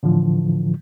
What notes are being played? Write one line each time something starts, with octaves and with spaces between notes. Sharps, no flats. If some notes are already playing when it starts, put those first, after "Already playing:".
A2 D3 E3 F3